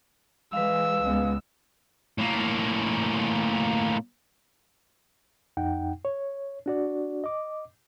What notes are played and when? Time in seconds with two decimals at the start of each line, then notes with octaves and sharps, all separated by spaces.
0.53 E3 G#3 B4 F5 E6
1.02 C#2 G#3 B3
2.19 A2 A#3
5.57 F2 D#4 F#5 G5
6.05 C#5
6.66 D4 F#4 D5
7.24 D#5 D6